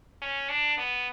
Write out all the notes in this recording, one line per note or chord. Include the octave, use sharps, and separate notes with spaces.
C#4
D4
B3